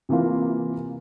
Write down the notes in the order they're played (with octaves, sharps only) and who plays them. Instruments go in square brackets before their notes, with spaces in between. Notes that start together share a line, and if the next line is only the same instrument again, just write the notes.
[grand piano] C3 E3 A#3 F4